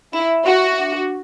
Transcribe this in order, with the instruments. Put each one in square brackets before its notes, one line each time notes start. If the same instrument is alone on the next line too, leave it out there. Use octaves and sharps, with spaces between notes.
[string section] E4 [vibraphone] E5
[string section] F#4 [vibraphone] E5
[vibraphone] D4